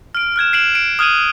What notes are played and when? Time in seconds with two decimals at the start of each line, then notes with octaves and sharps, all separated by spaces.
0.15 F6 D7
0.36 F6 F#6 G#6 E7
0.53 C7 D7 E7 F#7
0.75 D7
0.99 D#6 F6 F#6 G#6 D#7 F#7